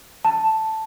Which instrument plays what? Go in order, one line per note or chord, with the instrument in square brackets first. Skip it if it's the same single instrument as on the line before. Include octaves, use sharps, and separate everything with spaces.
[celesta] A5